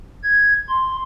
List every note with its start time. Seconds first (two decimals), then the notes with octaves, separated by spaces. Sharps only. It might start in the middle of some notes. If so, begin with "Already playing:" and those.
0.23 G#6
0.69 C6